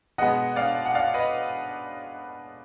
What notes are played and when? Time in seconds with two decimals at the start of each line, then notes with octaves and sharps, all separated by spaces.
0.18 B2 G#3 B3 D#5 F#5
0.56 D5 F5
0.86 F#5
0.95 D5 F5
1.14 B4 D#5